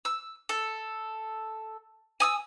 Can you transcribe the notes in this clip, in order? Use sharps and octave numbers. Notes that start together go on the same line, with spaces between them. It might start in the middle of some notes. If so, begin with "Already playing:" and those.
E6
A4
G#5 D#6 E6